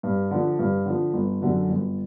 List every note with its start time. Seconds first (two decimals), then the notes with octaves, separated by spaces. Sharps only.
0.03 G2
0.31 D3 F3
0.59 G2
0.86 D3 F3
1.13 G1
1.41 F#2 D3 F#3
1.69 G1